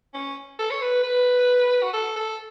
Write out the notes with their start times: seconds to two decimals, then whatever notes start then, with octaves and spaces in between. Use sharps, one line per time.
0.14 C#4
0.59 A4
0.70 C#5
0.81 B4
1.03 B4
1.82 F#4
1.93 A4
2.16 A4